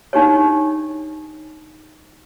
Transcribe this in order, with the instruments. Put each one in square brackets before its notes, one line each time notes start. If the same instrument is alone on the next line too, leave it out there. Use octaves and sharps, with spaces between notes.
[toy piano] D4 D#4 G4 C#5